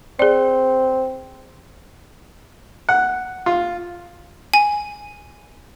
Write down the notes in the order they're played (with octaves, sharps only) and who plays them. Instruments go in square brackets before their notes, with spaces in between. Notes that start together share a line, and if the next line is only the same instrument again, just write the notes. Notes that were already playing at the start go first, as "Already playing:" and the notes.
[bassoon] C4 [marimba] G#4 D5
[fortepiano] F#5
F4
[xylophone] G#5